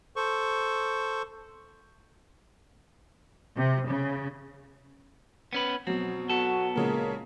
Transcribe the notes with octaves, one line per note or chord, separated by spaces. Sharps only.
A4 C5 C#6
C3
C#3
B3 C#4 B4
B2 F#3 C4
B3 F#4 A4
A#2 C#3 G#3 A#4